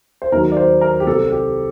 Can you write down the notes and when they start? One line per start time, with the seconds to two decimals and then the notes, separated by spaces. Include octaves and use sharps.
0.22 C5
0.32 D#2 D#3 F#3 A#4
0.52 D5
0.57 C5
0.81 A#4
1.00 G4
1.07 C2 C3 G3 A4
1.31 G4